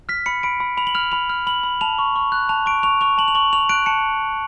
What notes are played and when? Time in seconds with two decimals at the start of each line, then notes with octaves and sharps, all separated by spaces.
0.09 F6 B6
0.26 B5 C#7
0.43 B5 D7
0.60 B5
0.77 B5 F7
0.87 F#7
0.95 F6 F7
1.12 B5 F7
1.30 F6
1.47 B5 F#7
1.63 B5
1.81 A5 F7
1.99 C#6
2.16 C#6
2.32 F#6
2.49 A5 F7
2.66 C#6 D7
2.83 C#6 F7
3.01 C#6 F7
3.18 A5 F#7
3.28 F7
3.35 C#6 F#7
3.53 C#6 F7
3.69 F#6 D7
3.86 A5 C#7